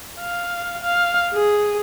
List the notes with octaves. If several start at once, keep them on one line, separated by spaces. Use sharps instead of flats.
F5
F5
G#4